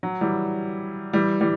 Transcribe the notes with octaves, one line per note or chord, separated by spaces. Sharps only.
F#3
E3 G3
E3 G3
E3 G3